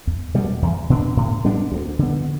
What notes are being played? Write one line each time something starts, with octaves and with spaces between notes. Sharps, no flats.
E2
B2 G3 B3
E2
B2 B3 D4
A2
G3 B3 D4
D2
D3 B3